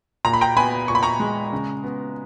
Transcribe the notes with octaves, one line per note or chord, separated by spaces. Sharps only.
A#2 A#5
B5
G5 A#5
B3 G#5 B5
A#2 C#6
B5
A#5 C#6
G#3
C#3
B3